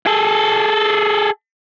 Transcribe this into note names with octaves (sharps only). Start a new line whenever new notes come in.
G#4 A4